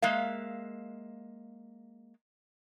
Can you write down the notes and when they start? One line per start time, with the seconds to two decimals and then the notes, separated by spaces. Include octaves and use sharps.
0.02 G#3 A#3 E5 F5